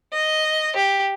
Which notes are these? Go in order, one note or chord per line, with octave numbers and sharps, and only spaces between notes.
D#5
G4